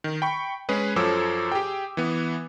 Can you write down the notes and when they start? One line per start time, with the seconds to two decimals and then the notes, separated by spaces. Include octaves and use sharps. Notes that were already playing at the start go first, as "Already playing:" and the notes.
0.04 D#3
0.22 G5 B5 C#6
0.69 G#3 C#4 G#4 B4
0.96 F#2 F3 A4 C#5 D6 E6
1.52 G4 G#4 G5
1.97 E3 B3